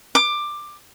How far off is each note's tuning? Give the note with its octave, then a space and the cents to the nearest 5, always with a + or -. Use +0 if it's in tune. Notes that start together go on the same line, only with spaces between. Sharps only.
D6 +15